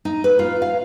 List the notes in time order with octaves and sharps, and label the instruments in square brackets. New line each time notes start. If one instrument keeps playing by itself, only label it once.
[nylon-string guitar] D#4
B4
F4
F5